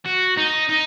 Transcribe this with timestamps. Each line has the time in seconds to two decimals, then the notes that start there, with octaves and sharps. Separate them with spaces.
0.06 F#4
0.37 D#4
0.69 D#4